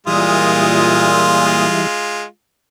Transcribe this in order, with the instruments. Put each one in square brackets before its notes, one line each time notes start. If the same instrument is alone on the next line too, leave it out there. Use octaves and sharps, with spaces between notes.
[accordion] A#2 D#6 [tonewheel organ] E3 G3 E5 [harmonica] G#3 F4